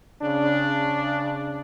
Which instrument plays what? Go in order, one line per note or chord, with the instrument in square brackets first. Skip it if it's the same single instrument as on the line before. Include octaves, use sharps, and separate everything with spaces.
[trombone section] C#3 D4